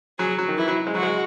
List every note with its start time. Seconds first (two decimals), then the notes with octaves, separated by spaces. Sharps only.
0.19 F#3 G#4
0.38 F#3
0.48 D#3
0.58 E3 E4
0.68 F#3
0.87 G#3
0.95 F#3 F#4
1.03 G#3